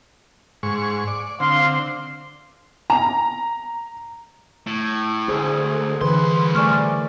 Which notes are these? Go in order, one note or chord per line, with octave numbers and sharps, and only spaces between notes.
G#2 C#6
D5
D3 C4 F5 C6
A#5
A2
D2 G#4 C5
C2 D3 E3 G#4 B4 C6
A3 A#4 D5 G#5 C#6 F6